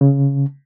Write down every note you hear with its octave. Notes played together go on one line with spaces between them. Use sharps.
C#3